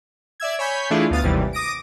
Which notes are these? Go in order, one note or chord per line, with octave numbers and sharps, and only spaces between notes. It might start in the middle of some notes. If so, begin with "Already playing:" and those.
D5 E5 E6 G#6
C#5 G#5 B5 G6
E3 A3 D4 E4 F4 G#4
D2 B3 F5 D#6 A6
G#1 D#2 C3 E3 G3
D6 D#6 A#6 D7